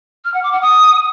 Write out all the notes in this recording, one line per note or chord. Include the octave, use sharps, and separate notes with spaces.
F6
F#5
D6
F#5
D#6